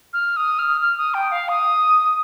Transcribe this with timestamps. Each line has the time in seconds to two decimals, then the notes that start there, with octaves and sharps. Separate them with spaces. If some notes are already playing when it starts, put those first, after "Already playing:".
0.13 F6
0.37 D#6
0.59 F6
0.81 F6
0.97 D#6
1.14 G5
1.32 F5
1.49 D#6